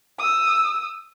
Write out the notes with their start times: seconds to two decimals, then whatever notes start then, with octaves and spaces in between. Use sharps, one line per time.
0.19 D#6 E6